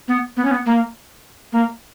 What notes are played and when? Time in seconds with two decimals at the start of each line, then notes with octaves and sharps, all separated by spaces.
0.08 B3
0.37 B3
0.45 C#4
0.51 B3
0.66 A#3
1.53 A#3